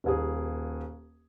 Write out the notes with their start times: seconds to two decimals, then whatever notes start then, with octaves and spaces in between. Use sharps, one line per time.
0.04 D#1 D#2 G#4